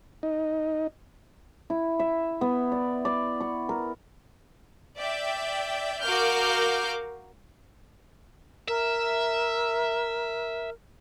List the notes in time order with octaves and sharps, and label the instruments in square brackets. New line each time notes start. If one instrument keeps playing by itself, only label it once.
[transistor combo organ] D#4
[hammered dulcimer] E4
E5
B3
D5
D5
C#6
A#4
[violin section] D5 E5 G5
F#4 A#4 F5 D6 F6 G6
[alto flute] A#4 [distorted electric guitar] E5